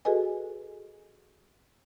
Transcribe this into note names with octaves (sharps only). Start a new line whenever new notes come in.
F#4 G#4 A4 B4 D#5 G#5